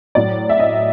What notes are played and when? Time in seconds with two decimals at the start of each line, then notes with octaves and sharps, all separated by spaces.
0.15 A2 F#3 D5
0.49 E5
0.59 D#5